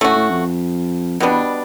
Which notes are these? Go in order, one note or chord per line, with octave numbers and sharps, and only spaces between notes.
A2 A3 C#4 F#4
A2
F2
F2 B2 G3 B3 D4
E2